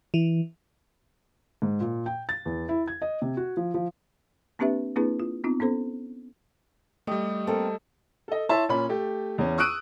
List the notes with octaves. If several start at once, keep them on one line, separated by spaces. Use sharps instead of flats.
E3
G#2
A#2
G5
A6
E2
E4
G#6
D#5
C3
F#4
F3
F3
A#3 C4 D4 G4 B4 E5
A#3 C4 D4 E4 G#4 B4
F4
B3 C4 D#4 F4
B3 C#4 A4 C5
G3 A3 G4 D#5
A#3 C4 A4
A4 D#5
E4 C#5 E5 A5 C6
A#2 C#4 B5
A3 G4
E2 C#4
C#6 D#6 E6 F#6 D7 D#7